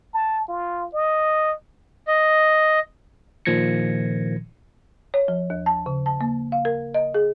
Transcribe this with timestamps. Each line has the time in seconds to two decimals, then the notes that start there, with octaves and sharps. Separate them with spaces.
0.14 A5
0.48 F4
0.94 D#5
2.07 D#5
3.45 A#2 D#3 F3 G#6 A#6 C#7
5.14 C#5
5.28 F3
5.50 D#2
5.66 A5
5.86 C#3
6.06 A5
6.21 A#3
6.52 F5
6.65 A#4
6.94 D#5
7.14 G#4